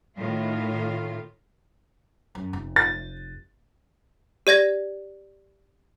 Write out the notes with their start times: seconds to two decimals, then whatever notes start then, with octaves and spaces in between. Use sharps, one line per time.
0.18 A2 D#3 F4
2.35 F#2
2.53 F1
2.76 A6
4.47 G4 D5 G#6 A#6